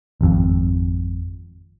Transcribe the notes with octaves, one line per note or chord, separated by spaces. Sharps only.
G#1 F2